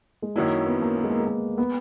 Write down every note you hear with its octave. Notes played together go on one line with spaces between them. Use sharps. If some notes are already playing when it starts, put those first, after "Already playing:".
G#3
F#2 D#3 F#3 A#3 C#4 E4
B3
A#3
A#3
G#3
A#3
G#3
A#3
B3